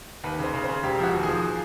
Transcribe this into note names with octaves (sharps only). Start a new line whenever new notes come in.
D#2 B4
C#3
C5
C#3
C5
C#3
E1 G4
F3 F#4
D#2
G#4
F3